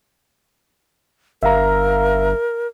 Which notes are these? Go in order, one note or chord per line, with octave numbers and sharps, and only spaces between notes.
G1 A#4 E5 F5 A#5